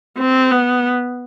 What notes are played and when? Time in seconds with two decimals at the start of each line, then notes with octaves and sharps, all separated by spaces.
0.18 C4
0.51 B3